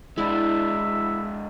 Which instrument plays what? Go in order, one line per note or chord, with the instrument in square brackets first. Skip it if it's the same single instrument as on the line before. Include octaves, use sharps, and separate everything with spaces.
[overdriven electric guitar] G#3 D4 [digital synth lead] E4 [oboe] E5